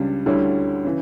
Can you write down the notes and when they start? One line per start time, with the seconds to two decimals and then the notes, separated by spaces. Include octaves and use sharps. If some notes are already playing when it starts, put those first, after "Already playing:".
Already playing: C#2 C#3 G3 D4
0.26 D2 D3 G3 C#4 E4
0.84 C#3 E3